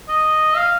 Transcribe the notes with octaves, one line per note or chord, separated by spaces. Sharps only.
D#5
F5